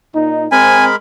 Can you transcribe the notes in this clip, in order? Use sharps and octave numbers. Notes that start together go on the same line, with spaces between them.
A#2 D#4
G#3 C4 A#4 G#5 B5